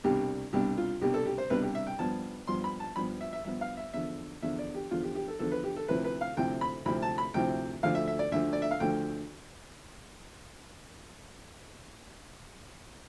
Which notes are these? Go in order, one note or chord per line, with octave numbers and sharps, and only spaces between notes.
C2 B2 G3 D4 G4
C2 B2 G3 D4 G4
F4
C2 B2 G3 D4 G4
A4
G4
C5
C2 B2 G3 D4 B4
G4
E5
G5
G2 F3 B3 A5
G2 F3 B3 C6
B5
A5
G2 F3 B3 B5
E5
E5
G2 F3 B3 E5
F5
E5
E2 D3 F3 E5
E2 D3 F3 E5
D5
G4
E2 D3 F3 F4
G4
G4
A4
E2 D3 F3 A4
B4
G4
A4
D2 C3 F3 C4 E4 B4
B4
F5
D2 C3 F3 C4 E4 G5
B5
D2 C3 F3 C4 E4 B5
A5
B5
D2 C3 F3 C4 E4 G5
D2 D3 F3 A3 F5
E5
E5
D5
D2 D3 F3 A3 E5
D5
E5
F5
D2 D3 F3 A3 G5